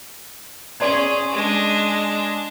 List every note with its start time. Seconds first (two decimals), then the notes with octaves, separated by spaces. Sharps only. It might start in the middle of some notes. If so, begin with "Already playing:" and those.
0.80 C#4 G#4 D5 C6 G#6
1.32 G#3 D4